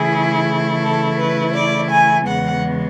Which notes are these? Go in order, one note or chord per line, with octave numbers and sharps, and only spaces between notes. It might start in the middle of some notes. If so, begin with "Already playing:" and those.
Already playing: C#3 E3 A3 E4 G#4
A4
B4
D5
G#5
E2 C#3 G#3 B3 F#5